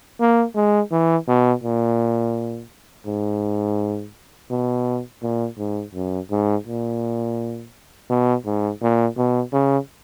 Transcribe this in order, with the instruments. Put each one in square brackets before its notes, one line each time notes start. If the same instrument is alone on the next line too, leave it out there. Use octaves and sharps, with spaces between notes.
[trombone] A#3
G#3
E3
B2
A#2
G#2
B2
A#2
G#2
F#2
G#2
A#2
B2
G#2
A#2
B2
C#3